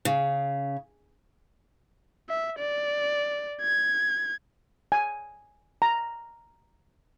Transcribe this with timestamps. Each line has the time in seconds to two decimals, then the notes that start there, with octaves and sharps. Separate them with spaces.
0.05 C#3
2.29 E5
2.59 D5
3.62 G#6
4.92 G#5
5.82 A#5